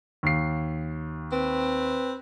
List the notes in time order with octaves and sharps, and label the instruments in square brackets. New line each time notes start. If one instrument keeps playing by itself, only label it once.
[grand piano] D#2 C7
[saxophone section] C4 B4